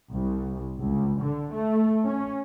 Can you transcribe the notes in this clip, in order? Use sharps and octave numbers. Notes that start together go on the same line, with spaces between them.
C2
C#2
D3
A3
C#4